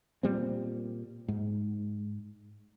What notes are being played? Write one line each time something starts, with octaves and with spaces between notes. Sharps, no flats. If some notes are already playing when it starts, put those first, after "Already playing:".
A#2 G3 C4
G#2